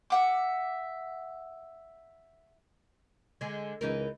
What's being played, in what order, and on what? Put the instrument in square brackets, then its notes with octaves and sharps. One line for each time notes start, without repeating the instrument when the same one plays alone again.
[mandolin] E5 F#5 D6
[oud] D3 G#3
[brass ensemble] C#2 [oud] E3 D#4 A#4